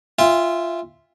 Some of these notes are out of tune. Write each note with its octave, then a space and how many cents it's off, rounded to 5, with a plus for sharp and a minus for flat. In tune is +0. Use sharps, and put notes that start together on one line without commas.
F4 -10 E5 +0 G5 +45